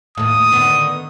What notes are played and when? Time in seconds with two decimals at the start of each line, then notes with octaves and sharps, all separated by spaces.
0.17 D#2 A2 D#6
0.51 D3 D#3 B3